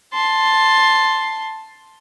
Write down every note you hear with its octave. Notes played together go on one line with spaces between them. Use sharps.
A5 C6